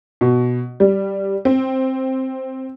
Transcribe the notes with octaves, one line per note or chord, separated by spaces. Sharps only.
B2
G3
C4